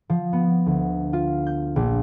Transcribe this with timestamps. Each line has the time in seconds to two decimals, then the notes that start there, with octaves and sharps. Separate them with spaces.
0.10 F3
0.33 B3
0.66 D2
1.13 F4
1.47 G6
1.76 A#1